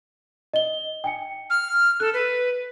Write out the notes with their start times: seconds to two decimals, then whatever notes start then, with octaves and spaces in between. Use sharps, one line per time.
0.54 D#5 G7
1.04 G5 G#5 C#7
1.50 F6
2.00 A4 F#6
2.14 B4